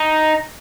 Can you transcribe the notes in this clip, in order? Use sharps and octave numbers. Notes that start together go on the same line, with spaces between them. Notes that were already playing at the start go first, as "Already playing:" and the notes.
Already playing: D#4